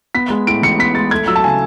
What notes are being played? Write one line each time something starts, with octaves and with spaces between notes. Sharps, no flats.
B3 B6
G#3
A2 D7
A1 C#7
B3 B6
G#3 A6
A3 G#6
F#3 E6
A5
C#3 G#5